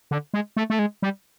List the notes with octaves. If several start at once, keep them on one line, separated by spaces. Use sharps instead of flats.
D3
G#3
A3
A3
G#3
G3